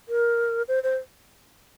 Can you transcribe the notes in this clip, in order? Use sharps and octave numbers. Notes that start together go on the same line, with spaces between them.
A#4
C5
C5